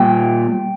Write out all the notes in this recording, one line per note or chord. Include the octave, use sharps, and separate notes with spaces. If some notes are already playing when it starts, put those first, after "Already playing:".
Already playing: A#2 G3 G5